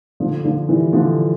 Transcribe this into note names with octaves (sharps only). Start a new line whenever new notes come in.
D3 F3
D3 F3
E3 G3
D3 F3